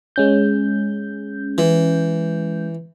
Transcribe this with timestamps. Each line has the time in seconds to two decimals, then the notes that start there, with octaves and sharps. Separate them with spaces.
0.16 G#3 C#4 G6
1.58 E3